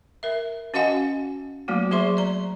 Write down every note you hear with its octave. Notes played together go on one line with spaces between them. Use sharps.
A#4 E5
C#4 F#4 D#5 F5 F#5 G#5
F#3 A3 A#3 F#4
F#3 G#4 C5 E5 C6 C#6
D5 A#5